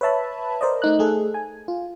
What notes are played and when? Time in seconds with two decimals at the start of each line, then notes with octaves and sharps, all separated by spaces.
0.01 B4 C#5 E5 A5 B5
0.61 A#4 C5 D5 D#5
0.82 A3 D#4 F#6
0.99 A3 G#4 A4
1.34 G#5
1.68 F4